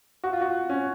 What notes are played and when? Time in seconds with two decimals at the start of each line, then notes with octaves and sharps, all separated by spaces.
0.24 F#4
0.33 F4
0.41 F#4
0.69 C#4